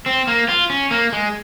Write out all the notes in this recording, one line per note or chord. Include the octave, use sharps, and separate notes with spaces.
C4
A#3
F4
C#4
A#3
G#3